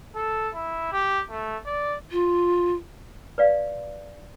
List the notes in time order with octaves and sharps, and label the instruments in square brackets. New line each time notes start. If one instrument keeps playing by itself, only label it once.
[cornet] A4
E4
G4
A3
D5
[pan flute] F4
[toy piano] B4 D5 F5